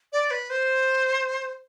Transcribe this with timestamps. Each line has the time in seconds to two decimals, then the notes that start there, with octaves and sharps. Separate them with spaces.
0.13 D5
0.31 B4
0.50 C5